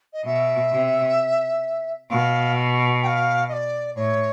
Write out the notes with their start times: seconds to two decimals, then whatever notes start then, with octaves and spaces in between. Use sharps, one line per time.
0.13 D#5
0.25 B2 E5
0.72 C3
2.10 B2 F5
3.02 G5
3.07 F5
3.49 D#5
3.53 D5
3.96 A2 C#5